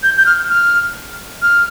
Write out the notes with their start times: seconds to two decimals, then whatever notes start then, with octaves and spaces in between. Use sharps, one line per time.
0.03 G6
0.18 G6
0.26 F6
0.50 F6
1.42 F6